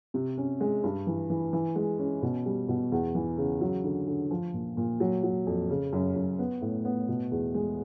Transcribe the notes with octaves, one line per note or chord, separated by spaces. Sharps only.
C3
C#4
G#3
G2
E3
E3
E3
G#3
C#4
B2
G3
B2
E2
E3
C#3
F#3
D3
D3
F3
A#2
A#2
F#3
F#3
F2
C#3
F#2
F#2
B3
A2
B3
B2
E2
G#3